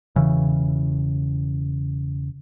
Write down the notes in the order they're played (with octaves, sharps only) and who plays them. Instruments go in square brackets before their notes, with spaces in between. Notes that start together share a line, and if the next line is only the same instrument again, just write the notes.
[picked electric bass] E1 C#3 E3